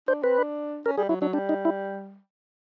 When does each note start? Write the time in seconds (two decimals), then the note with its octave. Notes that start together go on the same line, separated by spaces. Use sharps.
0.08 D4 C5
0.23 C4 B4
0.39 D4
0.86 C#4 A#4
0.98 G3 G#4
1.09 F#3 E4
1.21 F#3 D4
1.33 G3 D4
1.49 D#4
1.65 E4